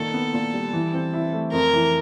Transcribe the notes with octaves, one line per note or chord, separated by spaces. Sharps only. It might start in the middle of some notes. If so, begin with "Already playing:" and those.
Already playing: A#2 D#3 A4
B3
A#2
G3
E3
C4
E4
A3
F2 A#4
E3